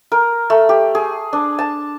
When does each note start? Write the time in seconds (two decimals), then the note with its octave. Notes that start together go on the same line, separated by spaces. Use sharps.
0.12 A#4
0.50 A3
0.69 G4
0.95 G#4
1.33 D4
1.59 A5